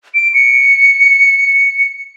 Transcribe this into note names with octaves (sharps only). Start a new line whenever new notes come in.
D7
C#7